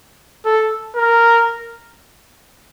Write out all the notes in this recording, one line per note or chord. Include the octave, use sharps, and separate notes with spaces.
A4
A#4